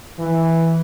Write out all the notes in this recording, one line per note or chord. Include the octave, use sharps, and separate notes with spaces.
E3